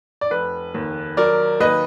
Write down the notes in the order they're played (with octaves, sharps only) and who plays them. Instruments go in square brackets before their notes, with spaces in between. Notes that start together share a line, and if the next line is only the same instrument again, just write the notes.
[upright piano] D5
F1 B4
D#2
F#3 A#4 D5
D#2 B4 D#5